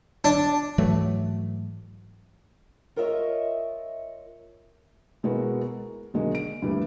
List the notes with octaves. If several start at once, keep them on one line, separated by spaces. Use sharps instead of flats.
D4
G#2 E3 F#3 A3
F4 A#4 C#5 D#5 E5
B2 G#3 B3 E4 F#4 A#4
A#4
B1 D3 G#3 F#4 A#4 D#5
D7
D2 G2 A#2 E3 G3 A#3